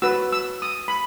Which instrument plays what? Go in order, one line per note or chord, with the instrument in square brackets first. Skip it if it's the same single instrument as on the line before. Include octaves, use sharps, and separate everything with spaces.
[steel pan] F#4 B4 E6
E6
D#6
B5